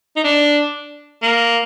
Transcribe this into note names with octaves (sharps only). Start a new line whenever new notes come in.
D#4
D4
A#3